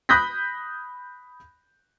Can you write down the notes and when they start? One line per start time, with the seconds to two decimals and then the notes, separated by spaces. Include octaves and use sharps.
0.09 B5 D#6 F#6 G6 A#6 B6